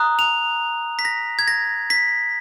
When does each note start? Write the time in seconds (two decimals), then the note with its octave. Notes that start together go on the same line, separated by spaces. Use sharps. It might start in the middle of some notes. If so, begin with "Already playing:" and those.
Already playing: A#5 D#6 F#6
0.19 F7
0.99 B6
1.05 A#6
1.39 G#6
1.48 A#6
1.90 B6